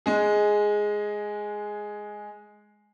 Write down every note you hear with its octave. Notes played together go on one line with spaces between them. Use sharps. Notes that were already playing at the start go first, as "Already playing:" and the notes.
G#3 G#4